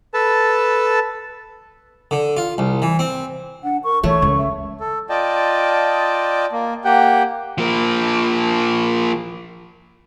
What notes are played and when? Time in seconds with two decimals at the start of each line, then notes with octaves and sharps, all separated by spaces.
0.14 A4 B4 A5
2.11 D3
2.37 F4
2.58 C2
2.82 E3
2.99 C4
3.64 D4 F#5
3.84 A#4 C#6
4.04 E3 A3 C#5 C#6
4.22 C#2
4.38 E5
4.80 A4
5.09 F4 D5 D#5 G5 A5
6.52 A#3
6.85 A#3 G4 F#5 G5
7.58 F3 A#3